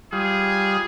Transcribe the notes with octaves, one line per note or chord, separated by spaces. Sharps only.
G3 F4 G#4